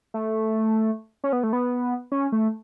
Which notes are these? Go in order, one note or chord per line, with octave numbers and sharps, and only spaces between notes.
A3
C#4
B3
A3
B3
C#4
A3